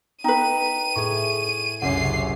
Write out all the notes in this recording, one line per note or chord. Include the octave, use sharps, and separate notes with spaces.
D#4 B4 G5 A#5 D#7
A2 G#4 C#6
F#1 C2 C#4 F#5 C7